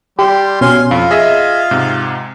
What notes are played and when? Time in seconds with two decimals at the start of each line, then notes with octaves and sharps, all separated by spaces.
0.19 G3 G4 C6
0.61 B2 C#4 F5 G#5 C6
0.91 F2 F4 F5
1.11 G#4 D#5 E5
1.71 G#2 C3